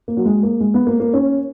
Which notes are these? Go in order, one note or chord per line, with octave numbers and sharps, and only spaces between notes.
A#3
F#3
G#3
A#3
G#3
B3
A#3
A#3
C#4